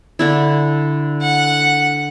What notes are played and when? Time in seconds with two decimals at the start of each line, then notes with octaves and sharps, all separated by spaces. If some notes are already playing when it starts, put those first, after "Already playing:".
0.19 D3 D4 E4
1.22 F#5